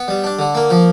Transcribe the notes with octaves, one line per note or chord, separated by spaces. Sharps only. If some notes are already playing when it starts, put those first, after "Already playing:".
Already playing: B3
G3
D4
D3
A#3
F3